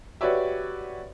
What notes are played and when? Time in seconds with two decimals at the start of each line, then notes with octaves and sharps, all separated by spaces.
0.21 F#4 G4 B4 C#5 D5 E5